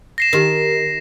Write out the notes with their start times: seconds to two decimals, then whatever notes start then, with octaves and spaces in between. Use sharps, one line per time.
0.18 A#6 C7 E7
0.33 D#3 D#4 G4 A#4